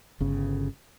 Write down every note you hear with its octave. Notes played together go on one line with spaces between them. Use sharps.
G1 C#3